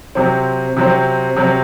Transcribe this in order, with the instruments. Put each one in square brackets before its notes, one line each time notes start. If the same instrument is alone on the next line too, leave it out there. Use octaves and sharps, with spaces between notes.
[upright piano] C3 F#3 C4
C3 F#3 C4
C3 F#3 C4